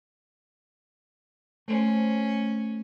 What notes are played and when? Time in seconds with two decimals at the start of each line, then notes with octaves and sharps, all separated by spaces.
1.68 A3 C#4 C5